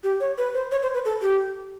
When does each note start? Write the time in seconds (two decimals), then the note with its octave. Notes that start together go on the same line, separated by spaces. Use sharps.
0.03 G4
0.20 C#5
0.38 B4
0.54 C5
0.71 C#5
0.82 C5
0.94 B4
1.05 A4
1.22 G4